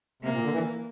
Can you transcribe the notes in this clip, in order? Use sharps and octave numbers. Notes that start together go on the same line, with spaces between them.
C3 A#3
A#2
D3
E3